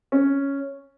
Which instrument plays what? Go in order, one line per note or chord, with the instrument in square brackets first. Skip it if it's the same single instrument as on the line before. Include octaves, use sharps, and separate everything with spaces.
[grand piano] C#4